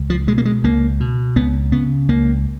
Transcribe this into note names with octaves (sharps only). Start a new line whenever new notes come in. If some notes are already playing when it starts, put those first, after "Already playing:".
Already playing: C#2
F3
B2 G#3
A#3
G#3
C#2 A#3
B2
C#2 B3
C#3 B3
C#2 A#3